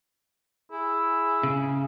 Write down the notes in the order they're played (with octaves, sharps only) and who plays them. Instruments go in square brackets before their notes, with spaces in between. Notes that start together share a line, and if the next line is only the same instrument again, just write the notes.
[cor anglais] E4 [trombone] G#4
[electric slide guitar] C#3